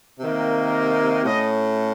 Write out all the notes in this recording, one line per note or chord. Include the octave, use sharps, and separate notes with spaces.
C3 D#3 A#3
A2 A3 C#4 D#5